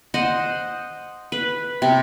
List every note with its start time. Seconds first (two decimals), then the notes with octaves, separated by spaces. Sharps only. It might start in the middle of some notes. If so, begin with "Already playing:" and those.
0.14 C5 D#5 F#5
1.32 B4
1.82 C3